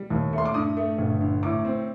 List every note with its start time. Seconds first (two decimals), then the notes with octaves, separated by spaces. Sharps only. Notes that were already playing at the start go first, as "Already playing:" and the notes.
Already playing: G3
0.10 D#2
0.33 A3 C6
0.46 D6
0.54 G2 D#6
0.77 A3
0.98 G1
1.21 D3
1.43 A2 D6
1.65 C4